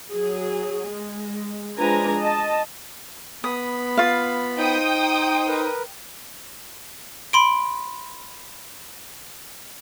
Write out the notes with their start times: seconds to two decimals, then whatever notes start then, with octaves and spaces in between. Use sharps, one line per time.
0.11 F#3 G#4
0.88 G#3
1.79 F3 G#3 D4 B4 G#5 A#5
2.20 D#5 A5
3.44 B3 B5 D#6
3.97 F4 F5
4.58 D#4 C5 G5 D#6
5.48 A#4 B4
7.33 B5 C6 D7